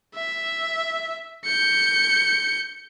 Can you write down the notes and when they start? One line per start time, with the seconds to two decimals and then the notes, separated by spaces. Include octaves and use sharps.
0.15 E5
1.45 G6 C#7